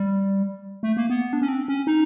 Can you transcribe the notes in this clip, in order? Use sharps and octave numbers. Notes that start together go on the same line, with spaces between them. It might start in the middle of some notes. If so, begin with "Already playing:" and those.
Already playing: G3
A3
A#3
B3
D4
C#4
C4
C#4
D#4